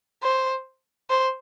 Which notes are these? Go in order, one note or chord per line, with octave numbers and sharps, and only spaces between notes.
C5
C5